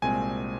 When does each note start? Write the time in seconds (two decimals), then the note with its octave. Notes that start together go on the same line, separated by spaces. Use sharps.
0.02 C2 A#2 G#3 C4 G#5